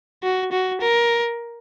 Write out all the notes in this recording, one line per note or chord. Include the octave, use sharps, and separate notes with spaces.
F#4
F#4
A#4